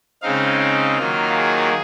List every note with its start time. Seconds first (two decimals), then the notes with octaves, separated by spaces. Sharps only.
0.22 C#3 G#3 C4 D#4 F5
0.60 F5
0.98 D#3 F#3 A#3 F4
1.35 G#4